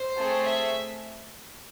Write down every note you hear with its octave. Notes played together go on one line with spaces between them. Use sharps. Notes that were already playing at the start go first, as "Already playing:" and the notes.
Already playing: C5
A3 C4 G#4
E5